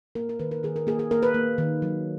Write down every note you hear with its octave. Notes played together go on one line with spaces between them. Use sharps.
A#3 A#4
A#4
D#3 B4
A#4
D#3 G#4
A#4
A#3 G#4
G#4
A#3 A#4
B4
A#3
D#3
F#3